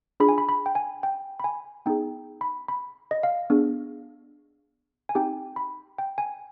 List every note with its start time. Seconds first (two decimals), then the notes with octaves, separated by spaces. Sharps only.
0.20 D4 F4 G#4 B5
0.29 G#5
0.38 B5
0.49 B5
0.66 G5
0.75 G#5
1.03 G5
1.40 B5
1.44 G#5
1.86 B3 D#4 G#4 G5
2.41 B5
2.68 B5
3.11 D#5
3.23 F5
3.50 B3 D4 G#4
5.09 G#5
5.15 C4 D#4 G4 G5
5.56 B5
5.98 G5
6.18 G#5